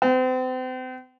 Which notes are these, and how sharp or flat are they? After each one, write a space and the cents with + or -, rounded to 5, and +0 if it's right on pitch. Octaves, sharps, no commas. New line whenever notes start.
C4 -35